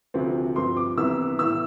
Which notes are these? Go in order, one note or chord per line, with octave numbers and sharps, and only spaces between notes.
D2 C3 F3 C4
G2 F3 C4 C6
D6
C2 C3 E3 B3 E6
A2 E3 B3 E6